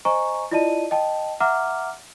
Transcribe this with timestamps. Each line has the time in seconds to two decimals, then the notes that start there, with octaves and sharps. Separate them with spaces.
0.05 C5 D#5 G#5 A#5 C#6
0.51 E4 F4 D5 D#5 A5 D#7
0.91 D#5 G5 A5
1.40 E5 F#5 A#5 D6 F6